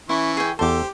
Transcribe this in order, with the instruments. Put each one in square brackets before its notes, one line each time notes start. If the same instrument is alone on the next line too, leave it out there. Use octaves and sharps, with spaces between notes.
[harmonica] E3 C#6 [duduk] C#4 [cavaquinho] E4
[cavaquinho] G#4 G5
[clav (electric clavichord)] E2 A5 [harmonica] G4 [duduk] A4 [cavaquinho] C5 D6